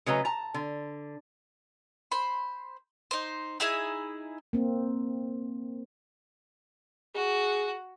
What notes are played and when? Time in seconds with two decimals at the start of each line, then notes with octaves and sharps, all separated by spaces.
0.06 C#3 F#3 A3 B4 D#5 A#5
0.25 A5 A#5
0.54 D3
2.12 C5 B5
3.11 D#4 C5
3.60 D#4 E4 G#4 E5
4.53 A#3 C4
7.15 F#4 G#4